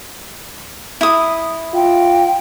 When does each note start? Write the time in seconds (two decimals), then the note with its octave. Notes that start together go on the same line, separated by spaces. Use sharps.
1.01 E4 D#6
1.74 F4 G5